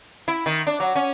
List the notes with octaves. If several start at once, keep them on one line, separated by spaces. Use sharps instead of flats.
E4
D#3
D4
F#3
C#4